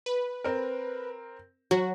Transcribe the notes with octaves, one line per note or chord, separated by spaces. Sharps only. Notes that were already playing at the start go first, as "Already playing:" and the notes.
B4
C4 A#4
F#3 F#4